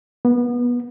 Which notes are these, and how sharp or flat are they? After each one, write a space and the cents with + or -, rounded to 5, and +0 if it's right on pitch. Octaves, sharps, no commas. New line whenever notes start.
B3 -25